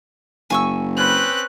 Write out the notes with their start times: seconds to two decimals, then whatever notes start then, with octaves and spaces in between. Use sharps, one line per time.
0.50 F#1 G#5 C#6 E6
0.96 C4 C#4 B4 F#6